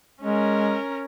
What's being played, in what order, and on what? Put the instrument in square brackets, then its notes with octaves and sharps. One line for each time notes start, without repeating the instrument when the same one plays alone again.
[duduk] G#3 [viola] C#4 A#4